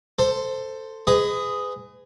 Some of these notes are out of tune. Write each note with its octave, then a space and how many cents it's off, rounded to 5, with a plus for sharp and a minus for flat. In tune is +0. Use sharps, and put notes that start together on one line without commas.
A4 +15 C5 +0
G#4 +0 B4 +35 D#5 +0